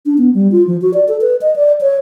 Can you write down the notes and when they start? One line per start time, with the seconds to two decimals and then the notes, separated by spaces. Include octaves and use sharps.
0.06 D4
0.18 B3
0.34 G3
0.52 F4
0.67 F3
0.82 F#4
0.94 D5
1.08 A4
1.21 B4
1.41 D#5
1.56 D5
1.81 C#5